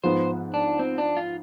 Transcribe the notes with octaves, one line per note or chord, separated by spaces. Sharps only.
G#2 F3 B3 C5
D4
C4
D4
F4